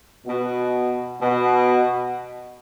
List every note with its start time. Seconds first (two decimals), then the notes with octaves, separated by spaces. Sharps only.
0.27 B2
1.21 B2